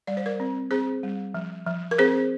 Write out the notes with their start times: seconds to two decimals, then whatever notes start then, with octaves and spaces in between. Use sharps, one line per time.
0.07 G3 D5
0.17 C5
0.26 A#4 D5
0.40 C4
0.71 C4 G#4 C5
1.03 G3
1.34 F3
1.66 F3
1.91 A#4
1.98 C4 G#4 C5